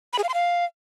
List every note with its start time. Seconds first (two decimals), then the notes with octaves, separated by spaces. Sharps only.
0.13 B5
0.18 G#4
0.24 F5
0.29 C6
0.34 F5